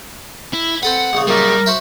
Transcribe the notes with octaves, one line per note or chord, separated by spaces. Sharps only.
E4
C4 A4 B4 F#5
A#1 C#3
C#2 F#2 A#2 G3 A#4
F#4 C5 E5